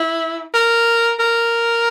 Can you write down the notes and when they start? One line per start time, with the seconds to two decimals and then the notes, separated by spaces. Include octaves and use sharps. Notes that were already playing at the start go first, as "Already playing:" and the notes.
Already playing: E4
0.54 A#4
1.20 A#4